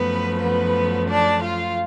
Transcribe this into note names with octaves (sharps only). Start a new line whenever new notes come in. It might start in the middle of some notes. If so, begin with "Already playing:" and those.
Already playing: F#2 F3 A3 B3 B4
B3 B4
D4 D5
F4 F5